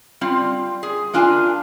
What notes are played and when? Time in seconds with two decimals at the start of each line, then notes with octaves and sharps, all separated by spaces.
0.21 G3 C4 F4
0.83 G#4
1.13 A#3 D4 F4 G#5 A5